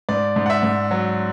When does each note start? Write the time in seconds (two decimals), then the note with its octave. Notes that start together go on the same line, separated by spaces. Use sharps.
0.09 G#2 D5
0.36 G#2
0.46 F#5
0.50 E5
0.63 G#2
0.91 F#3